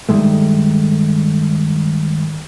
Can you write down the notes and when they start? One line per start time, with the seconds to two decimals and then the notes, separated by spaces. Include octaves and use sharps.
0.09 G2 D#3 G#3 A3